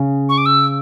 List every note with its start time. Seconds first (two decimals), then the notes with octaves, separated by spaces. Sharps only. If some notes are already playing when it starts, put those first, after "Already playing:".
Already playing: C#3
0.29 C#6
0.38 D6
0.46 E6